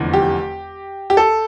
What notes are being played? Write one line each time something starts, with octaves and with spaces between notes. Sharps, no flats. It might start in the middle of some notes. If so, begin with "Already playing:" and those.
Already playing: F1 E2 D3 F3
G4
G4
A4